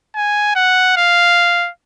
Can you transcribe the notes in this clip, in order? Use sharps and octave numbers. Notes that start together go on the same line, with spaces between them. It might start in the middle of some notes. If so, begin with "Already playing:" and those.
G#5
F#5
F5